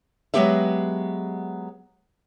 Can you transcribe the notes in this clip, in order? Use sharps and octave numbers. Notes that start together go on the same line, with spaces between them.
F#3 G#3 B3 G4 B4 E5